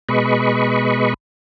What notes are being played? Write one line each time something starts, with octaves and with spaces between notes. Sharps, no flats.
B2 G#3 B4 D#5 B5 C#6